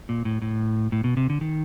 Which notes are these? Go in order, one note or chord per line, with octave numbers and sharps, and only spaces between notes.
A#2
A2
A2
A2
B2
C3
D3
D#3